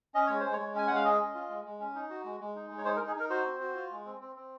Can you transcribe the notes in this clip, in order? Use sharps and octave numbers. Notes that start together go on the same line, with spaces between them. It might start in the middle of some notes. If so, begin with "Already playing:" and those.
C#4 D#5
G#3 C#5
G#3 C5
C#5
G#3
C#4 G#5
G#3 F#5
F5
G#4 D#5
C#4
F4
G#3
G#3
C#4
D#4
F#4
G#3
G#3
D#4
G#3
C#5
D#4 C5
A#4
D#4
G#4
D#4 A#4
F#4 C5
C4
F#4
F4
G#3
C4
C4
C4